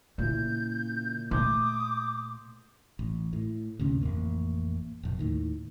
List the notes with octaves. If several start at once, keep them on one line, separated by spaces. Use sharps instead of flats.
A#2 C#3 E4 G6
A#2 A3 C6 D6 D#6 G6
A1
A2
D2 G2 C3 C#4
A1 F2 A#2 A#3
F1 A#1
D#2 A2 D#3